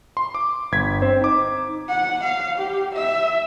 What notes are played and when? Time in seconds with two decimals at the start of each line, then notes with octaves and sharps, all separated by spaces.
0.17 C6
0.35 D6
0.72 G1 G#6 B6
1.02 C4 C5
1.21 D#4 D6
1.89 F#5
2.24 F5
2.58 G4
2.95 E5